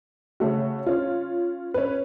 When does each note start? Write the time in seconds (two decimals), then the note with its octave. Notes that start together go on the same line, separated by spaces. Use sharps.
0.40 C#3 A3 F#4
0.86 C#4 F4
1.74 C#4 B4